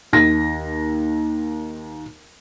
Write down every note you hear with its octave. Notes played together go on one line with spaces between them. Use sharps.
D#2 A#6